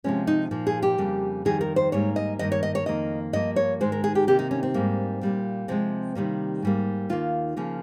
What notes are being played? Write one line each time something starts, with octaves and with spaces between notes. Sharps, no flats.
C3 F3 G#3 C#4
D#4
A#2 F3 A#3
G#4
G4
F2 C#3 G3 A#3
F2 D#3 G3 G#4
A#4
C5
G#2 G3 A#3 C#5
D#5
G2 D#3 A#3 D#5
C#5
D#5
C#5
F2 D#3 A#3 D#5
G2 F3 A#3 D#5
C#5
G#2 D#3 G#3 C5
A#4
G#4
G4
C3 D#3 A#3 G4
D#4
C#4
C4
G#2 G3 A#3
A#2 G3 A#3
C3 F3 G#3 C4
C3 D#3 G3 A#3
G#2 G3 A#3
D#2 D#3 A#3 F4
C#3 F3 A#3